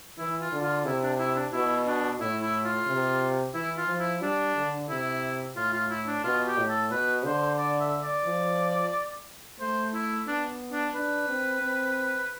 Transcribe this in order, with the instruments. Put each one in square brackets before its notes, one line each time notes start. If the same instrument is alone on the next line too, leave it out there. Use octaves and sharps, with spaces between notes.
[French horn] E3 [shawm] E4
[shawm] F4
[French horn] D3
[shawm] F4
[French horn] C3 [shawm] E4
[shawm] D4
E4
D4
[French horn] B2 [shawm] E4
[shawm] D4
[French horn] A2 [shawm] E4
[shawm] E4
F4
[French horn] C3
[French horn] E3 [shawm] E4
[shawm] F4
[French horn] F3
[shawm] E4
[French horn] G3 [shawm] D4
[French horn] D3
[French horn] C3 [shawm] E4
[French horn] A2 [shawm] F4
[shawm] F4
E4
D4
[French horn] B2 [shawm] F4
[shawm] G4
[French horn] A2
[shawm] A4
[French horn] B2 [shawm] B4
[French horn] D3 [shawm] C5
[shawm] D5
E5
D5
[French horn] F3
[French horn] A3 [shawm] C5
[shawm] E4
[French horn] B3 [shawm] D4
[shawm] D4
[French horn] D4 [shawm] B4
[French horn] C4
C4